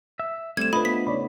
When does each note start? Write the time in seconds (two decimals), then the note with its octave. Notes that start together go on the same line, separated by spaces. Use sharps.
0.20 E5
0.57 G3 A3 C4 C5 G#6 E7
0.73 D4 F4 B4 D#5 B5
0.85 B3 B6
1.07 C#3 D#4 C#5 D5 B5